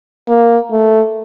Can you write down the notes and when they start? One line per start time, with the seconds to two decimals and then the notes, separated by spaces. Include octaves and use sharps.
0.28 A#3
0.71 A3